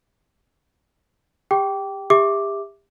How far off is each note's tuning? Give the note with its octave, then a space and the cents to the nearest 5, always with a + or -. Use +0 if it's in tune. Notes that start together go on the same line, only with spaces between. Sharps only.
G4 +25 G5 -15 D6 -20
G4 +30 E5 -5 D6 +0